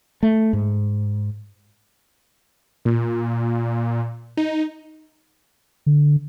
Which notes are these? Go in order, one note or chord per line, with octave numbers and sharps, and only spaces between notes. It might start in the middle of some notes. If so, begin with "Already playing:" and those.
A3
G#2
A#2
D#4
D3